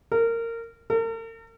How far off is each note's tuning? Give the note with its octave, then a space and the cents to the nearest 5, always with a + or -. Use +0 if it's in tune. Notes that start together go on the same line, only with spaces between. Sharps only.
A#4 -20
A#4 -45